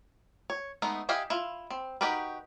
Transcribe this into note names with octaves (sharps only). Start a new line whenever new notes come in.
C#5
G#3 A3 B3 D#4
E4 G4 D#5 F5 G#5
E4 F4
C4
D#4 F#4 G4 A#4 B4